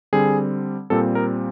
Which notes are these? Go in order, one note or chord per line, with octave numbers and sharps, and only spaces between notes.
D3 G3 C4 G#4
A#2 G3 C4 A4
A#4